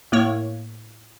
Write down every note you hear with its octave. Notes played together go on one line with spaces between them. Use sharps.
A2 A#3 C#5